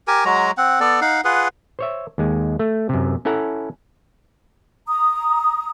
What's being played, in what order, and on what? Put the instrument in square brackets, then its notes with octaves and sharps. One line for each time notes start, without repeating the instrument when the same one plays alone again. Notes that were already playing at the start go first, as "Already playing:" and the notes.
[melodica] G4 A#4 G#5
F#3 G#3 F#4 A#5
C4 F#5
B3 A4 D5
D#4 F5 F#5
F4 G#4 B4 F#5
[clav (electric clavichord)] C5 C#5 E5
D#2 G#3
A3
F#2 C3
C#4 E4 A4 F#5 A#5
[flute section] A#5 D#6